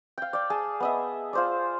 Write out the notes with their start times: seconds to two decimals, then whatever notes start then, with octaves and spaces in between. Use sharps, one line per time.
0.18 F5 G5
0.33 D5 G5
0.50 G#4 A5
0.80 B3 D#5 E5
1.33 F4 C5 D5